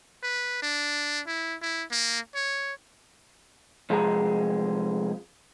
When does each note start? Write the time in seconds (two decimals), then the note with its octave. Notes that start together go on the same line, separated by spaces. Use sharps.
0.23 B4
0.62 D4
1.27 E4
1.62 E4
1.92 A#3
2.35 C#5
3.90 C3 F3 G#3 G#4 E5 A#5